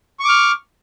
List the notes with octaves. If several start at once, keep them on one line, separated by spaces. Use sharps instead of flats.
C#6 D6 F6